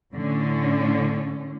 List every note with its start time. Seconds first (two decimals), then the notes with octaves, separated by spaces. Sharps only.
0.12 A2 D3 C#4